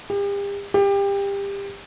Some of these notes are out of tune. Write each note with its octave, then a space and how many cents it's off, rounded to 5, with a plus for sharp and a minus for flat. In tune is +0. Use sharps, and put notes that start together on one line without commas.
G4 +40
G4 +25